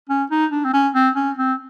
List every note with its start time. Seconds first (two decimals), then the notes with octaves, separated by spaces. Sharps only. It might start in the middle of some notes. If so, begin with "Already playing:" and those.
0.09 C#4
0.31 D#4
0.52 D4
0.65 C4
0.73 C#4
0.95 C4
1.16 C#4
1.38 C4